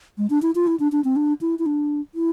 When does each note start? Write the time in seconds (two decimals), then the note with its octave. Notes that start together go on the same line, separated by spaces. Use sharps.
0.18 G#3
0.30 D4
0.42 E4
0.55 F4
0.67 E4
0.80 D4
0.92 D4
1.04 C4
1.16 D4
1.41 E4
1.59 E4
1.66 D4
2.15 E4